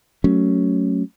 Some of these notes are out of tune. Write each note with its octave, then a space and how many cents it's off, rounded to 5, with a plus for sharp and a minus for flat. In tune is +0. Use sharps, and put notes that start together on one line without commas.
F#3 +0 A3 +0 C#4 +0